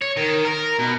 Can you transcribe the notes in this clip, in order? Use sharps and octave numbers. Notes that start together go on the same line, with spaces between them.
C#5
D#3
A#4
B2